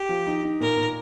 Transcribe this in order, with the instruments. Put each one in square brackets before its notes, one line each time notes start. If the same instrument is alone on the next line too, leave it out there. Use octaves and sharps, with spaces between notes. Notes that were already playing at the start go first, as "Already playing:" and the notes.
Already playing: [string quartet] G4
[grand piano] F3
D#4
D#4
[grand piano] A#2 [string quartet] A#4
[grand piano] A#2